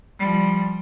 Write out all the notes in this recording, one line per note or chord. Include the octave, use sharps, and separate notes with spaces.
F3 G3